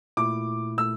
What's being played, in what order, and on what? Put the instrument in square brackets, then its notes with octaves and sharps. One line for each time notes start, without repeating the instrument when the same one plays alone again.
[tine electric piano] A#2 A3 E4 [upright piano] D6
[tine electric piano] A#2 A3 E4 [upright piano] E6